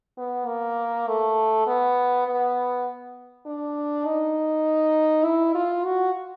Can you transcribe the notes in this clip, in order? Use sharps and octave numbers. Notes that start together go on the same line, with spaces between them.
B3
A#3
A3
B3
B3
D4
D#4
E4
F4
F#4